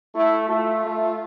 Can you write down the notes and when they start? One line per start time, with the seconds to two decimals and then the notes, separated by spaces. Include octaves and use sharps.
0.15 A3 E4
0.49 A3 F4
0.85 A3